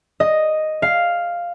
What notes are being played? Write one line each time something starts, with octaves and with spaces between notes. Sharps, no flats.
D#5
F5